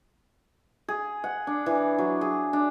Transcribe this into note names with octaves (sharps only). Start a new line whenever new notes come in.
G#4
F#5
D4
E3
F#3
G#4
D4